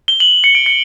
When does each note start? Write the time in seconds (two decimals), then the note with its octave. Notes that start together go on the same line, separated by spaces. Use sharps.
0.08 G7
0.20 F#7
0.44 C#7
0.55 D7
0.66 C#7